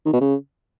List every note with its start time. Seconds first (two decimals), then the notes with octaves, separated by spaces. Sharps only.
0.06 D#3
0.13 B2
0.21 C#3